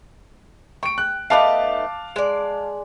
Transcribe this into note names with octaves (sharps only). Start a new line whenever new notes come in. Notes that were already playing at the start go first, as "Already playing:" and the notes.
G5 C#6 D7
F#6
A3 B3 D#4 F5 A5 D6
G#3 D5